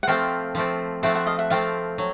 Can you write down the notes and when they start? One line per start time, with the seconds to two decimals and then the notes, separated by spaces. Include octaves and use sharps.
0.03 F#5
0.07 F3 A3 C4 F5 G5
0.55 F3 A3 C4
1.03 F3 A3 C4 E5 F#5
1.14 E5 F#5
1.26 D#5 F5
1.39 E5 F#5
1.50 F3 A3 C4 F5 G5
1.98 F#3